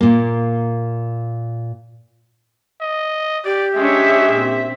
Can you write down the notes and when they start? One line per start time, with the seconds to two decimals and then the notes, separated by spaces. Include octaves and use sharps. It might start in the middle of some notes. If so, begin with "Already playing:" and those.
0.01 A#2 A#3
2.81 D#5
3.45 G4 D5
3.76 G#3 C#4 D4 C#5 E5
4.29 A#2 C4